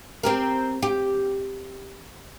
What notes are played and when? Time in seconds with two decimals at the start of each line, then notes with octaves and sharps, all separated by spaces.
0.23 C4 G4 A#4
0.83 G4